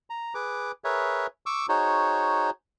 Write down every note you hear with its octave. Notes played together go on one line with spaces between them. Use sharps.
A#5
G#4 B4 D6
G#4 A#4 B4 C#5 E5
C#6 D6 E6
D#4 F#4 G#4 C5 C#5